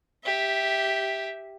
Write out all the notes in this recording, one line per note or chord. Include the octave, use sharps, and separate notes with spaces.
G4 E5